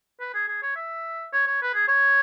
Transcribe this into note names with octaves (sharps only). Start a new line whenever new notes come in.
B4
G#4
G#4
C#5
E5
C#5
C#5
B4
G#4
C#5